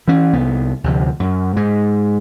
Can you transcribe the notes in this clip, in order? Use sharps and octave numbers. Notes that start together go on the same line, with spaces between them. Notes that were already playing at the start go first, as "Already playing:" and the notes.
E3 C#4
C2 B3
D2 C3 F3
F#2
G#2 G#3